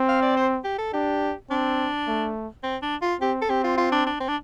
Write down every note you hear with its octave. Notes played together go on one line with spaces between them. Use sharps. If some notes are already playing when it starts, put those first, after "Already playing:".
Already playing: C4
F5
D5
C5
G4
A4
D4 G4
C4 D4
A3
C4
D4
F4
C4 G4
A4
C4 G4
F4
F4
D4
D4
C4
D4